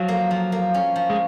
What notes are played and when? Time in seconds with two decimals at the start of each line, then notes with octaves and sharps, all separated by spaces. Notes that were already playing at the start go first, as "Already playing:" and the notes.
Already playing: F3 F#3
0.08 A#3
0.31 F3
0.52 A#3
0.74 C#4
0.96 F3
1.10 G#3